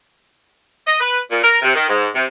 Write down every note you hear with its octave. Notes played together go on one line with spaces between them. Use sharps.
D#5
B4
A#2
A#4
C3
D#3
G#2
C3